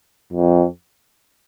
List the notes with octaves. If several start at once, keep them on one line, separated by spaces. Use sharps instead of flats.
F2